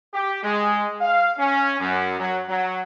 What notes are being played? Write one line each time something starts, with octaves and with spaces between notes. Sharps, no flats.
G4
G#3
F5
C#4
F#2
F#3
F#3